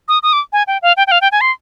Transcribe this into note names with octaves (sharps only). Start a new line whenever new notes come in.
D#6
D#6
D6
G#5
G5
F5
G5
G5
F5
G5
G#5
C6